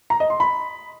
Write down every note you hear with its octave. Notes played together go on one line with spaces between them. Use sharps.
A#5
D#5
C6
B5